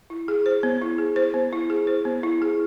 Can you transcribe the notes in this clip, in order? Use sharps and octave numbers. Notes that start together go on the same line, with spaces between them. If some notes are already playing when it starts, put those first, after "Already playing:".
E4
G#4
C5
B3
E4
G#4
C5
B3
E4
G#4
C5
B3
E4
G#4